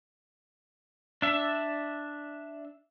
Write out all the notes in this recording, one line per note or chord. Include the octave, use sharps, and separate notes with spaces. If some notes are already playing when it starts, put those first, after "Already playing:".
D4 E5